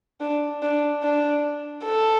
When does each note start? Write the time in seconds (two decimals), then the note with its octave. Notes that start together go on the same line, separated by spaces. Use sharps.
0.21 D4
0.62 D4
1.03 D4
1.85 A4